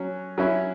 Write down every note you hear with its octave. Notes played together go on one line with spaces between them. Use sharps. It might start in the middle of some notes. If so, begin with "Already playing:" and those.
Already playing: F#3 C#4
F#3 C#4 E4